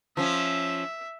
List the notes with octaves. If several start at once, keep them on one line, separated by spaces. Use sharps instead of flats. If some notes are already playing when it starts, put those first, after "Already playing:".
F3 C#4 E5